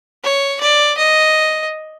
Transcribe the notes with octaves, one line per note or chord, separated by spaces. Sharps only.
C#5
D5
D#5